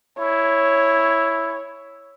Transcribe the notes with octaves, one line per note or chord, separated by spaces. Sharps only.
E4 C#5